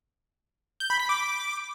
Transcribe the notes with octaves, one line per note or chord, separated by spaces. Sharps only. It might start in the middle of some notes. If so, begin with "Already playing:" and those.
G6
B5
B6
D6